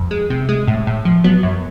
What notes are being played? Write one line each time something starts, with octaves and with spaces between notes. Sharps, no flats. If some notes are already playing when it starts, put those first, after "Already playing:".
Already playing: F2
G#3
C3
G#3
A2
A2
F3
F#3 B3
F#2